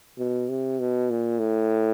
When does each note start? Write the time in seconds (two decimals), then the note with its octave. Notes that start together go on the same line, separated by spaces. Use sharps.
0.18 B2
0.49 C3
0.79 B2
1.10 A#2
1.40 A2